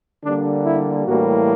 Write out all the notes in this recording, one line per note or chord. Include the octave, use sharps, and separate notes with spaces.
D3 G3 A#3 D4
E4
A2 E3 G3 A#3 F#4